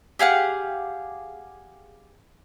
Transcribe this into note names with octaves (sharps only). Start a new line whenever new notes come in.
G4 G#4 F5 F#5